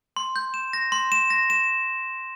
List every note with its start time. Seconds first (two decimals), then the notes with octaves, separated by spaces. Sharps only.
0.16 C6
0.36 G6
0.54 E7
0.73 A#6
0.92 C6
1.12 E7
1.30 A#6
1.50 E7